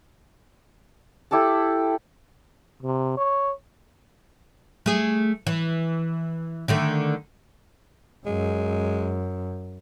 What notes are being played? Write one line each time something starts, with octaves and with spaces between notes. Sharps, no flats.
E4 G4 A4 A5
C3
C#5
A3 G#4
E3
D3 D#3 A3
F#2 G#3